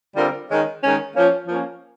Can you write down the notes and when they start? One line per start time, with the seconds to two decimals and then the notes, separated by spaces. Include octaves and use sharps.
0.16 D3 G3 C4 F4 A#4
0.49 D#3 G#3 C#4
0.82 D#3 G#3 C#4
1.15 F3 A#3 C#4
1.48 F3 A#3 C#4